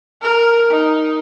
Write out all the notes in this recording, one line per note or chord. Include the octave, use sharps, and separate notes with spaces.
A#4
D#4